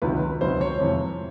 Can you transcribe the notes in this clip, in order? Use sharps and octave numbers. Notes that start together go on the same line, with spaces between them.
C#2 C3 D#3 F#3 B4
C#2 C3 D#3 F#3 C5
C#5
F2 C3 E3